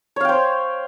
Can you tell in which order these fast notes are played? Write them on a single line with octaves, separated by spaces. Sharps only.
C#5 F5 G5 C5